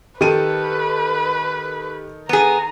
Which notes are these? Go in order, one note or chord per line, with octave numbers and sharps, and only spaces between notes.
D#3 G4 A4 B4 D#7
B3 G#4 A#5